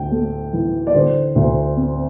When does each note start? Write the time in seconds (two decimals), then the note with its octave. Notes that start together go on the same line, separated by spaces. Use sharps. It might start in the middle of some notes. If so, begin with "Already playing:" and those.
Already playing: D2 G5
0.11 A3
0.53 E3
0.87 D5
0.94 D3 C5
1.36 D2
1.77 C4